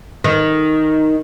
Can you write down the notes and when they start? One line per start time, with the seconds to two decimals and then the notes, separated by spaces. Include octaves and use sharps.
0.24 D#3